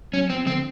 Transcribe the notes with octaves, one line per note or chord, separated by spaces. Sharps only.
F#3 C#4
F3 C4
D3 C4